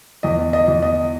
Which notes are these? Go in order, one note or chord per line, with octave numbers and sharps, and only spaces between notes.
E2 D#5
D#5
E2
D#5